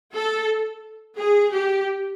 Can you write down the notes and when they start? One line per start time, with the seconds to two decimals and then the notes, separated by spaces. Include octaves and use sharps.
0.15 A4
1.18 G#4
1.53 G4